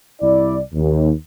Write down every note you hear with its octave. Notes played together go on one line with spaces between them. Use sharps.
C2 E4 D5
D#2